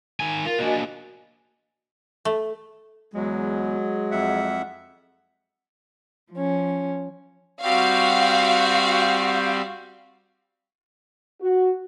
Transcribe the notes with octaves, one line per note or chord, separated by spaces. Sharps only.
D#3 G#5
F4 A#4
A#3 D4 F#4 D#5 G#5
A3
E2 F#3 G#3
F2 E5 F#5
F3 C#4
G3 C4 F#4 F5
F#4